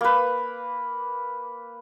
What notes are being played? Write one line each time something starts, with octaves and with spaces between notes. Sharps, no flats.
A#3 B4